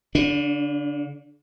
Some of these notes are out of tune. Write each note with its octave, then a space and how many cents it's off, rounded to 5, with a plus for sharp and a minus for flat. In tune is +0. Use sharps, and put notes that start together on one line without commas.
D3 -45 D4 +0